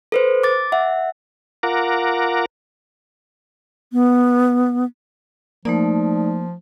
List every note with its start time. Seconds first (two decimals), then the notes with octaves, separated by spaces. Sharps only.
0.12 A4 B4 C5
0.43 D6 A6
0.72 E5 F#5
1.63 F4 A#4 F#5 A#5 D6
3.93 B3
5.65 F3 A3 A#3 D#4 D5